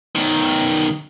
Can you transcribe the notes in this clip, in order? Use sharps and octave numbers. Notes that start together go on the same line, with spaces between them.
B1 D#3